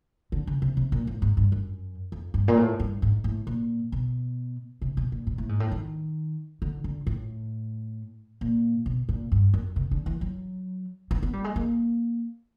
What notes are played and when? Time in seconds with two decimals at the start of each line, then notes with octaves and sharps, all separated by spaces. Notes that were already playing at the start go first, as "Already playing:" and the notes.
0.32 D3
0.47 C#3
0.62 C3
0.77 C3
0.92 A#2
1.07 A2
1.22 G#2
1.37 G2
1.52 F#2
2.12 F2
2.34 G2
2.48 A#2
2.57 A2
2.80 G2
3.02 G#2
3.24 A2
3.47 A#2
3.92 B2
4.82 C3
4.97 B2
5.12 A#2
5.27 A#2
5.38 A2
5.49 G#2
5.60 A2
5.72 D#3
6.62 D3
6.84 D3
7.07 A2
8.41 A#2
8.86 B2
9.09 A#2
9.32 G2
9.54 F#2
9.76 C3
9.91 D3
10.06 E3
10.21 F#3
11.11 B3
11.23 B3
11.33 G3
11.44 G#3
11.56 A#3